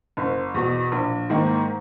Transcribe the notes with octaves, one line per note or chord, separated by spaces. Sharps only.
F#1
E2 B2
A#1
G#2 D#3 A#3